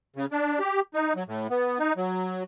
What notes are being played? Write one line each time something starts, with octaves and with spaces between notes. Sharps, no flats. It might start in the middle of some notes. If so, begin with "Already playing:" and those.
C#3
D4
G4
D#4
F#3
A2
B3
D#4
F#3